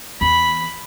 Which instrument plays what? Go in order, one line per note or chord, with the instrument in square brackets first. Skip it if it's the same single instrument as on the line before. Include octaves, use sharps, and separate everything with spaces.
[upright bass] E2 [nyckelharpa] B5